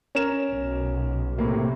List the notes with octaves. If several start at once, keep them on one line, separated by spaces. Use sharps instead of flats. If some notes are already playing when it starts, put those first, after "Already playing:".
C#4 A#4 E7
B1
A2 C3 A#3